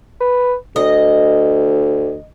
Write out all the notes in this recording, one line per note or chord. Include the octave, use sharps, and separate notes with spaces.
B4
D2 D#5